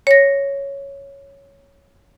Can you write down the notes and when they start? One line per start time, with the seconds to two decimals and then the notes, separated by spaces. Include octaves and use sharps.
0.07 C#5 A#6